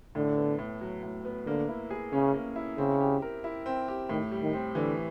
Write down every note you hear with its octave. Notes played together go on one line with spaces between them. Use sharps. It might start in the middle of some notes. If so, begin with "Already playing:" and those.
A2 D3
B3
A2
F#3
A2
B3
D3 A#3
E4
G#4
C#3 C#4
A#3
E4
C#3 C4
G4
A#4
E4
C4
G4
A2 D#3
G3
D#3
C4
D3 E3